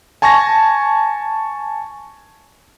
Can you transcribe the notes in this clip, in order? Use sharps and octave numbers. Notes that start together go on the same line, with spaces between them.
G#5 A5 C#6 G#6 A#6